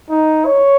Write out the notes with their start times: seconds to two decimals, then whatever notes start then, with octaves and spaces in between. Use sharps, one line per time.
0.10 D#4
0.46 C#5